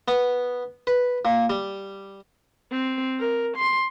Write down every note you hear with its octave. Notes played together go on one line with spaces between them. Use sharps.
B3
B4
A#2
G3
C4
A#4
C6